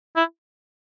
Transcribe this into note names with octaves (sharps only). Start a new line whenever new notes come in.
E4